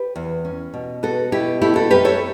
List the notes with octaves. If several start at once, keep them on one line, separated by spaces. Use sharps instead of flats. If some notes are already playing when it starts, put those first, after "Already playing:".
Already playing: G4 B4
E2
C#4
B2
B3 F#4 A4
B2 E4 G4
A3 E4 G4
F#4 A4
F#2 G4 B4
A4 C#5